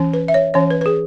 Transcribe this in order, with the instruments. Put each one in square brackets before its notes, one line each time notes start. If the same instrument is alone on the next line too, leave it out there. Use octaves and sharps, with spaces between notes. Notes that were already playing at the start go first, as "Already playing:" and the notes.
Already playing: [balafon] E3 C#4
B4
E5
C#5
E3 C#4 C#5
B4
B4
G#4